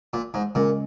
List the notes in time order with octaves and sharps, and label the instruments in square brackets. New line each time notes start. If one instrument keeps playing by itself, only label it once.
[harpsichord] A#2
G#2
[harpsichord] A#2 [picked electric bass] C#3 G#3 C#4